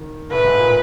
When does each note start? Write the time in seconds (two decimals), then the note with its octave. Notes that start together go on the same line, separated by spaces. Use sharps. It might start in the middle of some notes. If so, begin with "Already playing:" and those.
Already playing: D#3
0.31 A2 A3 B4
0.44 G#2 G#3
0.58 A#2 A#3